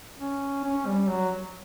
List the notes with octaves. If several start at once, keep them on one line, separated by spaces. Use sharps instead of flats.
C#4
C#4
G3
F#3